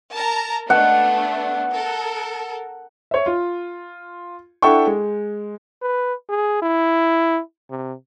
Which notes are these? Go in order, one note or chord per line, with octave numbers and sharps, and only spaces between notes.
A#4 A5 A#5
A3 B3 D4 F#5
A4 A#4
C#5 E5
F4
D4 E4 A4 F#5 G5 C#6
G#3
B4
G#4
E4
C3